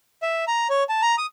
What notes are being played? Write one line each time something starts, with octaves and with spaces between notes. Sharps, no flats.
E5
A#5
C#5
A5
A#5
D#6